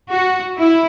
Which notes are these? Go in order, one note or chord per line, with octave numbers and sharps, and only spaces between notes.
F#4
E4